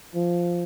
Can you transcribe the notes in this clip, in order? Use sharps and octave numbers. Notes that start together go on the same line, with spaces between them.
F3